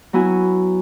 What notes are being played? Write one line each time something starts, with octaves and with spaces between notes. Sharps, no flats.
F#3 B3 E4 F#4 G#5